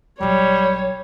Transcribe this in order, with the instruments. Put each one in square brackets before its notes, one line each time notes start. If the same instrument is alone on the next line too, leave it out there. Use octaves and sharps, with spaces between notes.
[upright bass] A#1 F#3 [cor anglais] G3 [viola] C#5